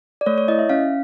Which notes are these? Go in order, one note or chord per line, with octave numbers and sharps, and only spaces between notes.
D5
A3 C#5
C#5
E4 D#5
E5
C#4 F5